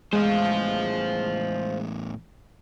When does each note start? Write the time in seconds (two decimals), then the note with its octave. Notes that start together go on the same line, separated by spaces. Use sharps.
0.13 E2 A2 G#3 C5 F5